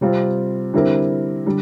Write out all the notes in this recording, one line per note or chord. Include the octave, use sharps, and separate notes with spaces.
C3 G3 C4 F4
D3 G3 C4 E4 A#4
D3 G3